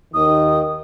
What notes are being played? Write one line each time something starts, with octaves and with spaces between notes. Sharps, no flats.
D#2 D#3 D#6